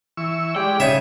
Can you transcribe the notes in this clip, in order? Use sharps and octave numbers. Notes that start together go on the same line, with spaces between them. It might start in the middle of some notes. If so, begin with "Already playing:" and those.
E3 C#6 E6
G#3 G4 D5 G5
C#3 D#4 C#5 E5 G#5